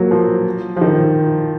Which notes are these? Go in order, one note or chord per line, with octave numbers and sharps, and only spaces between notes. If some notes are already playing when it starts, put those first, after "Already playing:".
Already playing: F#3 A#3
F3
F3
D#3